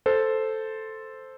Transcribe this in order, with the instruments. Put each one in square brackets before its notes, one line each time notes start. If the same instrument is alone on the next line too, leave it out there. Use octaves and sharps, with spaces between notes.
[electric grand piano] A4 C5